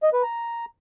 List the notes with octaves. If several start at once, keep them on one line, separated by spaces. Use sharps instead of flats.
D#5
B4
A#5